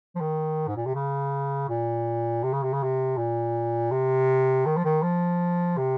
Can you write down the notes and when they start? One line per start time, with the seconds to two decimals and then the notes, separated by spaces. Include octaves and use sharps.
0.16 F3
0.21 D#3
0.68 G#2
0.77 A#2
0.86 C3
0.95 C#3
1.69 A#2
2.43 C3
2.53 C#3
2.63 C3
2.73 C#3
2.83 C3
3.18 A#2
3.92 C3
4.66 D#3
4.77 F3
4.85 D#3
5.03 F3
5.78 C3